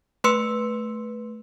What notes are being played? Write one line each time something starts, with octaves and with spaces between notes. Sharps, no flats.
A3 B4 C6 E6 C#7